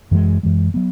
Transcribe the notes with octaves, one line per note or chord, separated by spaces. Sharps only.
F#2 E3 G#3
F#2 E3 G#3
F#3 B3